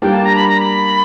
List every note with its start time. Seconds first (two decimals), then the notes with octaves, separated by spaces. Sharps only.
0.02 G3 A#3 D4 G5
0.13 A5
0.25 A#5
0.36 B5
0.48 A#5
0.58 B5